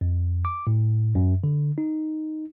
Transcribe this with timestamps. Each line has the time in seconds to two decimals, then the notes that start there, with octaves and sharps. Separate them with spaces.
0.01 F2
0.45 D6
0.67 A2
1.15 F#2
1.44 D3
1.78 D#4